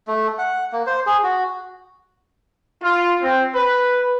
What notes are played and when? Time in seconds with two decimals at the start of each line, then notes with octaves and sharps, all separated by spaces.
0.08 A3
0.38 F#5
0.72 A#3
0.87 C5
1.07 G#4
1.23 F#4
2.82 F4
3.22 C4
3.54 B4